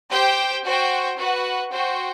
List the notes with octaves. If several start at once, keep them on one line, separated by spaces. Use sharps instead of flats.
G4 C5 G5
F#4 C5 G5
F#4 B4 F#5
F#4 C5 G5